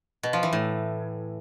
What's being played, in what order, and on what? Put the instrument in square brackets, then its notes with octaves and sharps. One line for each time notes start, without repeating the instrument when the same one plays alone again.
[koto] B2
F3
E3
A2